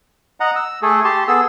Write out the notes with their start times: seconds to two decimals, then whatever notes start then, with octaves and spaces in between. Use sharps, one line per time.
0.40 D#5 F#5 A#5
0.56 E6
0.82 A3 G#4 A4
1.04 G4 A5 C6
1.28 B3 G#4 A4 E6